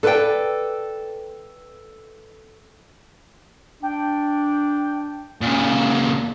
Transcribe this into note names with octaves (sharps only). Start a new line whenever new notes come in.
A4 B4 C5 D5 G5
D4 G5
A#2 C#3